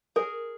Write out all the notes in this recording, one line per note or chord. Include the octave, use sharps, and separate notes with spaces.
G#4 A#4